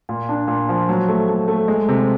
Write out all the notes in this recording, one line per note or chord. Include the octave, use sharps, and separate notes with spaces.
A#2
D4
A#2
F3
F#3
A3
A3
A3
G#3
C3